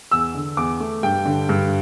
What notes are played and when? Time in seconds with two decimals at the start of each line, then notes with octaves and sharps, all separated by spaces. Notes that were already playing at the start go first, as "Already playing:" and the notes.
0.11 E2 E6
0.35 D3
0.57 E2 D6
0.80 A3
1.03 G2 G5
1.25 D3
1.49 G2